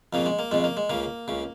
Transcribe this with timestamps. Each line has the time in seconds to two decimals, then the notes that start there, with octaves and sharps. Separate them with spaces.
0.13 F2 C#3 A#3
0.26 G#3
0.39 A#3
0.51 F2 C#3 G#3
0.64 A#3
0.77 G#3
0.90 C#2 C#3 A#3
1.28 C#2 C#3